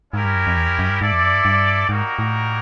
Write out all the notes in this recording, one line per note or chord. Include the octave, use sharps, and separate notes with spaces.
G#2 C#4 E4 G4 A#4
G2
F#2
F2
E2
F2
F#2
G2
G#2 E4 A4 D5
F2
F#2
G2
G2
G#2 G3 A#3 D#4 F#4 A#4
A2